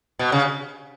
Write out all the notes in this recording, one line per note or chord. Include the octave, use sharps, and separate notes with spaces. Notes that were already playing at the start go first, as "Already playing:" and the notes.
B2
C#3